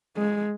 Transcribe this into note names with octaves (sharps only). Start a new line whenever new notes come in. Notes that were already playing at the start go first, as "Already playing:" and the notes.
G#3